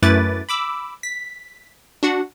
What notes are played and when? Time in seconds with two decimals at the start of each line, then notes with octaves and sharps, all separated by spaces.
0.03 F#2 A3 E4 B4 D6 A6
0.49 B5 D6 E6
1.03 B6
2.03 D4 F#4 F#5